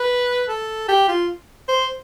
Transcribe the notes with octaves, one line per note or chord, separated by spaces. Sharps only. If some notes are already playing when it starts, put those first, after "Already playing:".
Already playing: B4
A4
G4
F4
C5